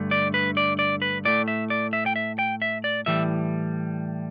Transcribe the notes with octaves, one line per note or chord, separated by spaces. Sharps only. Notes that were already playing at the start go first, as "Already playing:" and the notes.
Already playing: G2 D3 A3
D5
B4
D5
D5
B4
A2 A3 D5
E5
D5
E5
G5
E5
G5
E5
D5
A2 E3 G3 E5